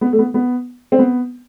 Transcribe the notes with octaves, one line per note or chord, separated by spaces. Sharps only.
B3
A3
B3
B3
C4
B3